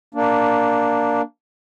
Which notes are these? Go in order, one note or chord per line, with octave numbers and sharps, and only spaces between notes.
A#3 D4